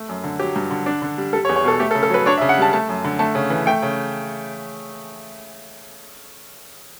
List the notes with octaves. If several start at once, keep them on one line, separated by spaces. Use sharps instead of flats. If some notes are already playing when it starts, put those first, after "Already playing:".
Already playing: A3
F#2
D3
F#3 G4
G2
D3
D4
D3
G3
G3 A4
C#5
E2
C#5
B2 A4
A3 G4
A4
C#3
A4
F#3 B4
D4 C#5
E5
C#3
F#5
G3 A5
A3 A5
F#2
D3
A3 A5
C#3
E3
A3 G5
C#3